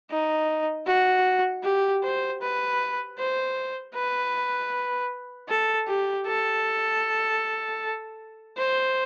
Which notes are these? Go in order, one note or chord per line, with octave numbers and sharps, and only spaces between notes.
D#4
F#4
G4
C5
B4
C5
B4
A4
G4
A4
C5